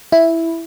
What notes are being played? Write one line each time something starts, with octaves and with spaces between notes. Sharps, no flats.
E4